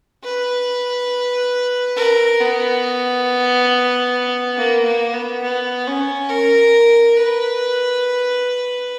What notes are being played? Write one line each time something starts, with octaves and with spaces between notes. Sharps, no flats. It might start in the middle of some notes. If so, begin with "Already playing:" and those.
B4
A#4
B3
A#3
A#3
B3
B3
C#4
A#4
B4